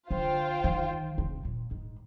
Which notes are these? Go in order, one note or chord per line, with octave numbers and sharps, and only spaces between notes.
D3 F4 C5 G5
D#3
C3
A#2
G#2